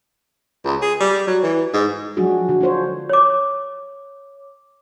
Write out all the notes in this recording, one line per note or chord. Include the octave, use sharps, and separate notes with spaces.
C#2
G#4
G3
F#3
E3
G#2
F3 F#3 G#3 D4 F#4 G#4
D3 F#4
D4 F4 C5 C#5
C#5 D6